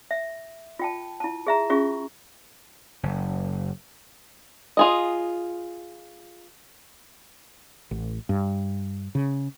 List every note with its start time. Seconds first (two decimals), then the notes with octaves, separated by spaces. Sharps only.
0.11 E5
0.79 F4 G5 A5
1.20 E4 A5
1.47 G#4 E5 A#5
1.70 C#4 F4 G#4 E5 C#6
3.03 F#1
4.77 F4 G#4 D#5
7.91 A1
8.29 G2
9.15 C#3